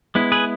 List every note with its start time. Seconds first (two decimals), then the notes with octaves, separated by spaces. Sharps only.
0.15 G#3 B3 E4
0.32 G#4 B4